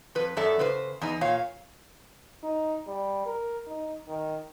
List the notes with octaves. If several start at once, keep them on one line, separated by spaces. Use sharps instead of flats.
F2 B4
F#2 F#3 A4 D5 E5
C#3 B4 C5
E2 D#4
A#2 C#5 F5
D#4
G3
A#4
D#4
D#3